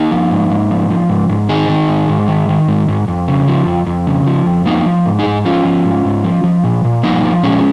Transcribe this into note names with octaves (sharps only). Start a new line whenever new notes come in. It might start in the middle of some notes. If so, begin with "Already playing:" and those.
Already playing: A#3 D#4
F3
G#2
G#2
F3
F3
G#2
G#2
D#3 D#4 G#4
D#3
G#2
G#2
D#3
D#3
G#2
G#2
F2
C#3
F3
F2
F2
C#3
F3
F2
F3 A#3 D#4
F3
G#2
D#4 G#4
G#2
F3 C#4 F4
F3
G#2
G#2
F3
F3
A#2
A#2
F3 A#3 D#4
F3
A#2 G#3 C#4